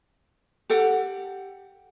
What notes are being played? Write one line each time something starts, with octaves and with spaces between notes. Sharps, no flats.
G4 A4 F#5